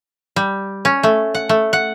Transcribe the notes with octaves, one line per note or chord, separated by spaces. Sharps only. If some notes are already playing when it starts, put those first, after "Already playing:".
G3
C#4
A3
F#5
A3
F#5